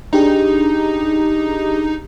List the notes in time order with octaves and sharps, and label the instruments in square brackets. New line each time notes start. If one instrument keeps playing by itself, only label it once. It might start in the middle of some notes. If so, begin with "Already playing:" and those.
[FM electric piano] D4 G4 G#4 [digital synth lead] D#4